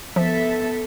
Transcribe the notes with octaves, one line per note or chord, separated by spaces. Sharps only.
F3 B3 A4 E5